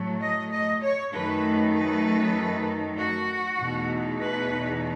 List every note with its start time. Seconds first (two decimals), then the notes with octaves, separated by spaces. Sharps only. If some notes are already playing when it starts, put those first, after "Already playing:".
Already playing: A2 F#3 A3
0.21 D#5
0.51 D#5
0.82 C#5
1.13 F#2 D#3 A3 D#4 B4
1.74 B4
2.98 F#4
3.59 E2 B2 A3 D#4
4.20 B4